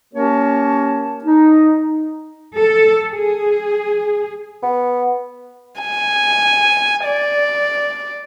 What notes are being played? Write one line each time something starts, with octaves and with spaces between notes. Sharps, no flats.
A#3 C#4 G4 A#4 C#5 A5
D#4
A4
G#4
B3
G#5
D5